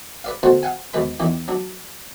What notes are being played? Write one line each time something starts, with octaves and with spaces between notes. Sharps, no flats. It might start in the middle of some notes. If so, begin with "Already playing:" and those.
B4 D5 F5
D2 B2 F#4 C5 F#5 A5
F5 F#5 G#5
D#2 G#2 B2 B4 B5
E2 D#3 E3 A#3
F#3 D4